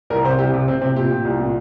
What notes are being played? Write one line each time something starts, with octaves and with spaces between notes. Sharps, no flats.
C2 A#4
C3 C5
C2 G4
C3
C3 C4
C3 C4
A#2 G4
A#2
C2
A#2